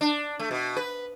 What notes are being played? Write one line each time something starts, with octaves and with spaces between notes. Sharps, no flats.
D4
A3
B2
B4